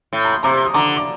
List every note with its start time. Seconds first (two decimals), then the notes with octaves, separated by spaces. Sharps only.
0.13 A2
0.25 A#5
0.34 C6
0.43 C3 A#5 D6
0.66 D#6
0.74 D3 A#5 D6
0.97 D6